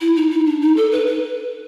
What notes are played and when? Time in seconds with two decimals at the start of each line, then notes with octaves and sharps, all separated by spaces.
0.01 E4
0.16 D#4
0.31 D#4
0.46 D4
0.62 D#4
0.77 A4
0.92 B4
1.07 B4